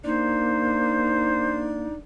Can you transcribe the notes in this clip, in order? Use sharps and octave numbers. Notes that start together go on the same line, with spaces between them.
A#3 D4 D#4 C5